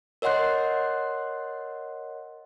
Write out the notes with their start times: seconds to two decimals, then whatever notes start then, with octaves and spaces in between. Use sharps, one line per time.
0.22 A#4 C#5 D#5 F#5 C6 F#6